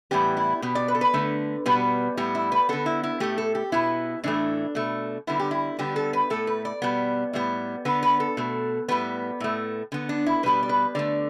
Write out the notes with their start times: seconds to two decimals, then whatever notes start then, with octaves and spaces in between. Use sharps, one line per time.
0.11 A2 E3 G3 B3 G4
0.37 E4
0.62 B2 B3 G4
0.75 D5
0.88 B4
0.95 A4
1.01 B4
1.14 D3 A3
1.66 B2 G3 B3 B4
2.17 A2 G3 B3
2.35 E4
2.52 B4
2.69 D3 B3 A4
2.86 E4
3.03 E4
3.20 A2 A3 G4
3.38 A4
3.55 G4
3.72 B2 B3 E4
4.23 A2 E3 A3 D4
4.75 B2 A3
5.27 D3 G3 B3 E4
5.40 G4
5.51 E4
5.79 D3 G3 B3 G4
5.96 A4
6.13 B4
6.30 A2 A3 A4
6.47 B4
6.65 D5
6.82 B2 G3 B3
7.33 A2 G3 B3
7.85 D3 B3 B4
8.03 B4
8.20 A4
8.37 B2 A3
8.88 A2 G3 B3 B4
9.40 A2 A3
9.92 D3 B3
10.09 D4
10.26 E4
10.43 B2 G3 B3 B4
10.63 D5
10.69 B4
10.95 D3 A3 D5